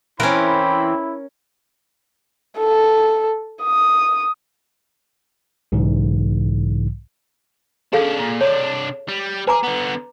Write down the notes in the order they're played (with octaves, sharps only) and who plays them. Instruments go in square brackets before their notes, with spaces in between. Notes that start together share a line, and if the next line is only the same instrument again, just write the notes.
[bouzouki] E3 C4 [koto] C#4 A#4 [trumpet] E4 [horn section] C5 B5
[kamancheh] A4
D#6
[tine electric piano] B1 G#2 C#3 E3
[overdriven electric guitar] C#4 D4 [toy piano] G#4 A4 F5
[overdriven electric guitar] A#2
[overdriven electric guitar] C3 D4 [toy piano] C#5
[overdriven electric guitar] G3
[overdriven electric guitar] G#4 [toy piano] B4 A#5 D6
[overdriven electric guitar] D3 B3